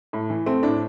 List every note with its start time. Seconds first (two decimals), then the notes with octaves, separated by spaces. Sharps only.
0.13 A2
0.30 E3
0.46 A3 C4
0.63 A2 D4